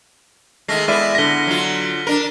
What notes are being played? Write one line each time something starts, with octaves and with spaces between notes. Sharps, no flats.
D#3 G#3 A3 F6 A#6 C7
G#3 B3 E4 D5 E5 F6 D#7
D3 A#6 B6 G7
F#3 F4
D4 A#4